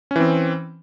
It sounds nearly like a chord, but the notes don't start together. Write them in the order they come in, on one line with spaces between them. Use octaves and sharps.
C#4 E3 C4